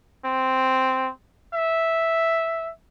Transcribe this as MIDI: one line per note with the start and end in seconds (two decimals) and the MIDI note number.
0.25 1.10 60
1.54 2.71 76